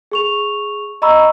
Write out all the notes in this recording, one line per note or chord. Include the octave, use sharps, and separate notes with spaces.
G#4 C#6 F7
D#5 A#5 B5 C#6 E6